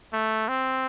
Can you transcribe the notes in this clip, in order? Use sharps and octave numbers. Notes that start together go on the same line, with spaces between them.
A3
C4